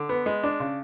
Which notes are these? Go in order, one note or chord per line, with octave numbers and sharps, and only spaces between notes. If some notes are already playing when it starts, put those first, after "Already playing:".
Already playing: D3
B3
G#3
D4
C#3